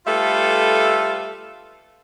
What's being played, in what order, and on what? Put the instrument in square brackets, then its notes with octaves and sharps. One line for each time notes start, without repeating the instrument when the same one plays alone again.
[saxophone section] G3 A3 F4 A4 B4 E5